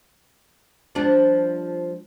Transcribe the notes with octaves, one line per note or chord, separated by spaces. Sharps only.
F3 G3 D4